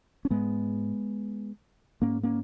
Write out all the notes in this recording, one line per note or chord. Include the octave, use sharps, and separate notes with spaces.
C#4
G#2 G#3 B3
G#2 A#3 C#4
A#3 C#4